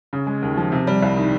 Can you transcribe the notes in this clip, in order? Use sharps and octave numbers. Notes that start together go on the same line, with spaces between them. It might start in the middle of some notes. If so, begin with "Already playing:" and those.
C#3
G#3
D#2
F3
C3
G3
C2
D#3